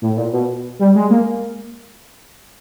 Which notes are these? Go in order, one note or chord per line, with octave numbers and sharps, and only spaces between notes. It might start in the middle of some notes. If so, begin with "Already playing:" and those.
A2
A#2
B2
G3
G#3
A#3